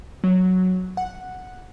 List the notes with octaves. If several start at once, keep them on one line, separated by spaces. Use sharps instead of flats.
F#3
F#5